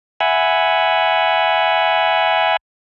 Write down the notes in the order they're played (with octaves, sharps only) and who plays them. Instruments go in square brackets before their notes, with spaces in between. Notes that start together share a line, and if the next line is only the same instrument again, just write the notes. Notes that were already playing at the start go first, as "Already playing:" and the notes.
[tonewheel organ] E5 F#5 G#5 B5